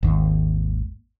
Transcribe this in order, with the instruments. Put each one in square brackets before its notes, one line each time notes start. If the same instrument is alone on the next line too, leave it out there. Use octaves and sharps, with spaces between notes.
[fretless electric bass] G#1 D#2